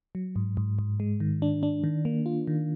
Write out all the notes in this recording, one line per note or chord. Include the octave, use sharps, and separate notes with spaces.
F#3
G#2
G#2
G#2
G#3
D#3
D4
D4
D#3
A#3
F4
D#3